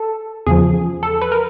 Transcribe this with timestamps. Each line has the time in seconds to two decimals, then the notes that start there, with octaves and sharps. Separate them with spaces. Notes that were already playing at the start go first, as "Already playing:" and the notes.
Already playing: A4
0.47 E2 C#3 F3 G#4
1.03 A4
1.22 B4
1.32 A#4